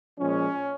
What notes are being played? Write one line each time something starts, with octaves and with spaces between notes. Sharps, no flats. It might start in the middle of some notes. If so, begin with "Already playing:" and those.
A#2 F3 G#3 C#4